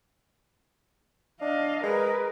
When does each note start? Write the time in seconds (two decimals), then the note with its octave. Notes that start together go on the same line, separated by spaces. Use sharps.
1.41 D4 D#5 F5
1.83 G#3 A#4 B4